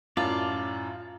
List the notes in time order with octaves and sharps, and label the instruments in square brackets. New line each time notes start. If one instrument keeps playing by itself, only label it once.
[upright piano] F#2 A2 [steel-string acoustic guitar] F4 [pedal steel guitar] D5 F5 A5